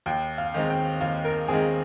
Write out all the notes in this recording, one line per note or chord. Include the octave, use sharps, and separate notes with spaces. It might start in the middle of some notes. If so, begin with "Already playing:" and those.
D#2 G5
F5
D#3 G#3 C4
G5
D#2 F5
A#4
D#3 G#3 C4 G#4